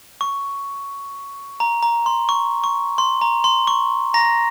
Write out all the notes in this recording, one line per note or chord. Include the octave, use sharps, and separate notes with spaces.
C#6
A#5
A#5
C6
C#6
C#6
C6
A#5
C6
C#6
A#5 A#6